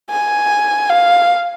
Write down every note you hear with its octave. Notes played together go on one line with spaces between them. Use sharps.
G#5
F5